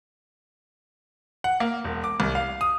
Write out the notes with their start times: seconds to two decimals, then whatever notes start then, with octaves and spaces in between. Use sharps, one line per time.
1.44 F#5
1.60 A#3
1.84 E1
2.04 D6
2.20 C2
2.35 F5
2.61 D#6